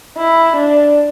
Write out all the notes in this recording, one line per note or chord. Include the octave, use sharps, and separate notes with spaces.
E4
D4